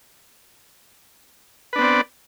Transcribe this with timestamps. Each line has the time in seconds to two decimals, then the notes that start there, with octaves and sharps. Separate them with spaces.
1.73 B4
1.76 D4
1.78 B3
1.81 C4
1.84 D5